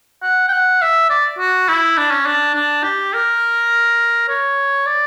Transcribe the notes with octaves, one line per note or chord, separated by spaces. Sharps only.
F#5
G5
F#5
E5
D5
F#4
E4
D4
C#4
D4
D4
G4
A#4
C#5
D5